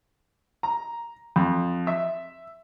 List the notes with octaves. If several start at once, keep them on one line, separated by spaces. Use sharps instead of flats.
A#5
F2
E5